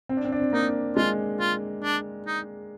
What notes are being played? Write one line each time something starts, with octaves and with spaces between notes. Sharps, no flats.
C4
D4
C4
D4
C4
A#3 D#4
G#3 F4
F4
D4
D#4